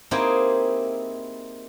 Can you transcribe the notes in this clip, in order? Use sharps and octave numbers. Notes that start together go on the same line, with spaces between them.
A#3 C4 D#4 E4 G4 G#4